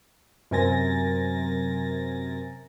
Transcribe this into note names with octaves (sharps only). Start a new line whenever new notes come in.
F#2 C3 A#4 G#5 A6 A#6